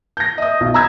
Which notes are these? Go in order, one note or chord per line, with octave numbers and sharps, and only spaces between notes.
G6 A#6
D#5 E5 D#6
B1
A#5 B5 D#6 E6 G6 G#6